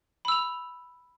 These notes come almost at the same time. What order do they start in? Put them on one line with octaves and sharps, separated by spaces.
B5 E6 F7